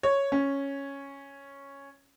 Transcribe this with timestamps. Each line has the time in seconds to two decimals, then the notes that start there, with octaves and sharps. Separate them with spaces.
0.03 C#5
0.32 C#4